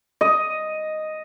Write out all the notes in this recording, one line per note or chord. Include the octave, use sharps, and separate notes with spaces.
D#5